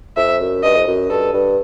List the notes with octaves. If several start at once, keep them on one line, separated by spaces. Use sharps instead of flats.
F2 E5
F#2
G2 D#5
F2
F#2
G2 A4
G2